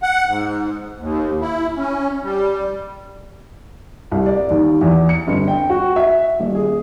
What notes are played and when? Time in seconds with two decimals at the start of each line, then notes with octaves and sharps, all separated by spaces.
0.03 F#5
0.27 G#2
0.99 D#2
1.41 E4
1.77 C#4
2.22 G3
4.11 C2
4.26 D5
4.50 D#2
4.81 E2
5.09 C#7
5.27 G1
5.48 G5
5.70 F#4
5.96 E5
6.40 D#1
6.55 G#4